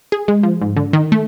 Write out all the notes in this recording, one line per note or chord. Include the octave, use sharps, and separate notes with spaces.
G#4
G#3
F3
G#2
D3
D#3
A3